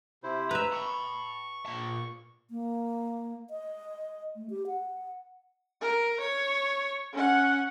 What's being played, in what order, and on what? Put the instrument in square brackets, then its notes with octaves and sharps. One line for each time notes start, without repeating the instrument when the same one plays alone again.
[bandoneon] C3 E4 C5
[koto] B4 E5 [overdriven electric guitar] A#5
[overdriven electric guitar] A5 B5 [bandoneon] C#6
[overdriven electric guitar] A#2 A5
[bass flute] A#3
D#5
A3
G4
F#5
[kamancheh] A#4
C#5
C#4 F#5